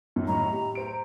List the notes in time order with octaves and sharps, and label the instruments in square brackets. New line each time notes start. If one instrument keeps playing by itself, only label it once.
[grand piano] F#2 D#3
[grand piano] A2 D#5 C#6 [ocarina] A#5
[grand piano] G4
C5 D7